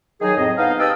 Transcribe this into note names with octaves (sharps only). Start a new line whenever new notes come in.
D#3 F#3 D#4 G#4
F2 A2 C4 D#5
B3 D#4 D#5 F5
G4 B4 G5 A5 D#6 E6